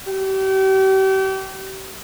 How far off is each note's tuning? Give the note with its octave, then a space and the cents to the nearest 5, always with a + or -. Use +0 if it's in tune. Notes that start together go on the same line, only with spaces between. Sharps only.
G4 -35